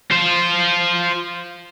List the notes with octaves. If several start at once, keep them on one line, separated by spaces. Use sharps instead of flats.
F4 C5